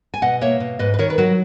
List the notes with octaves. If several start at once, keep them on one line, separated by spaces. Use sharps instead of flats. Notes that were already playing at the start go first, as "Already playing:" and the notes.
G#5
B2 D#5 F#5
A#3 C#5 E5
B2
G#2 B4 D#5
B4
D#3 A#4 C#5
B4
F#3 F#4 A#4